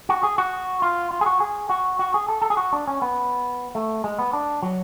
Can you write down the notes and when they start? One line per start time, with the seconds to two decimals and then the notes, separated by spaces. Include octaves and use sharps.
0.09 F#4
0.23 G#4
0.38 F#4
0.82 F4
1.11 F4
1.21 G#4
1.26 F#4
1.40 G#4
1.69 F#4
1.99 F#4
2.14 G#4
2.29 A4
2.42 A4
2.50 G#4
2.57 F#4
2.73 D4
2.87 C#4
3.02 B3
3.75 A3
4.04 G#3
4.19 B3
4.33 D4
4.63 F#3